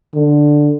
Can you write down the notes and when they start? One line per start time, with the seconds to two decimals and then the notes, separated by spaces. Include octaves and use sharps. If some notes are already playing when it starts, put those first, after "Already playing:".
0.15 D3